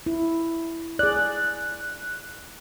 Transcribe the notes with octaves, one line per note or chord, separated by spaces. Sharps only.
E4
G#4 D5 F#6